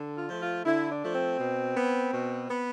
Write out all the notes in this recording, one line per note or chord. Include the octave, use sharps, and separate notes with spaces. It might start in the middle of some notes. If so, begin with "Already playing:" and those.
Already playing: D3
F4
F3 A3
F4
D3 E4
D4
F3 A3
C4
B2
B3
B2
B3